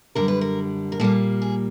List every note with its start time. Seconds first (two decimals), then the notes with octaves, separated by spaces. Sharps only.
0.15 F#2 D3 G3 A#4
0.28 B4
0.41 A#4
0.92 A#4
1.00 A#2 G3 A#3 A4
1.42 G#4